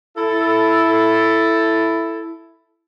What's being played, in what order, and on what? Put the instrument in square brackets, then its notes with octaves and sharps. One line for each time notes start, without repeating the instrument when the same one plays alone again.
[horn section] E4 A4